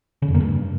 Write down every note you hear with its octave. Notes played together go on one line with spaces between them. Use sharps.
C#3
F2
A#3
G2